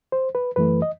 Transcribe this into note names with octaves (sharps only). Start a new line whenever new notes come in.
C5
B4
F#2 E3 A3 B4
D#5